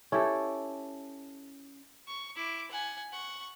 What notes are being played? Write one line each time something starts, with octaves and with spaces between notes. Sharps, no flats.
C#4 E4 G4 A4
C#6
E4 D6
F#5 G#5
F#5 C#6